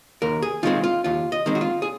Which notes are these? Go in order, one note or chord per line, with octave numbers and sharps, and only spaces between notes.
D#2 A#4
G#4
D#3 G#3 C4 F4
F4
D#2 F4
D#5
D#3 G#3 C4
F#4
F4
G#4